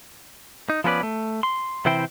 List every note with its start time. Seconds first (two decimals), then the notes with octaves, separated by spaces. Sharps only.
0.70 D#4
0.84 F3 B3 C#4 A4 B4 D5
1.03 A3
1.43 C6
1.85 C3 E3 E4 C5 G5